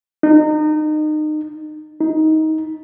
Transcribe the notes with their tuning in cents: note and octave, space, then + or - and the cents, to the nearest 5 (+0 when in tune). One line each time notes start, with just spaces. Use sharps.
D#4 -30
D#4 +15